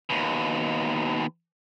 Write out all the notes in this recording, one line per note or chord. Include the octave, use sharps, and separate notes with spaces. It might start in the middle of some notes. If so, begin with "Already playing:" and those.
D#2 B2